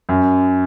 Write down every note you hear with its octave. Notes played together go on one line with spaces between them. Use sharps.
F#2